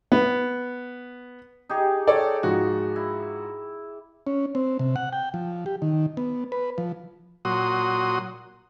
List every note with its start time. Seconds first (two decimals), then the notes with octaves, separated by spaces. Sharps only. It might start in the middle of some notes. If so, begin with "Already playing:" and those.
0.12 B3
1.69 D#4 G4 G#4
2.07 A4 C#5 D5
2.43 G#2 F3 F#4
2.96 E4
4.27 C#4
4.55 C4
4.79 C3
4.96 F#5
5.13 G5
5.34 F3
5.66 G4
5.82 D#3
6.17 B3
6.52 B4
6.78 F3
7.45 A#2 F#3 F#4 C6 D#6